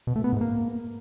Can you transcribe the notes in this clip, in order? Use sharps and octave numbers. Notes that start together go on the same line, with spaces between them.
B2
A3
B3
G#2
A#3